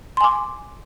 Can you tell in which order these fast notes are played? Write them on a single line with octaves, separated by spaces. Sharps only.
C6 G#5 D6